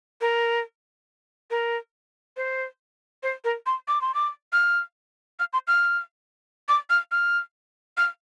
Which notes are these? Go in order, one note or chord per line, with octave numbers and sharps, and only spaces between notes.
A#4
A#4
C5
C5
A#4
C6
D6
C6
D6
F6
F6
C6
F6
D6
F6
F6
F6